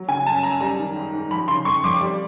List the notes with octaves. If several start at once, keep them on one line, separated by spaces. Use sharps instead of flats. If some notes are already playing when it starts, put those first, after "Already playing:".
Already playing: F#3
C#3 G#5
F#2 A5
F#2 A#5
G3 A#5
D#3
G#2
G#2
F3 B5
C#3 C6
F2 C#6
F2 D6
G3